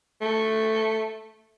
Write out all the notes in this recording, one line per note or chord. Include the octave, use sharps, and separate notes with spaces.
A3